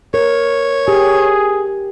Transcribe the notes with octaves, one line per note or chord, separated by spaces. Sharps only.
A#4 C#5
G4 G#4